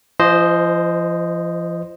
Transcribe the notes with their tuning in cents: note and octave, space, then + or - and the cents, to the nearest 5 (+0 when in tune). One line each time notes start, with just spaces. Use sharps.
F3 -40 C5 +0 D#5 -5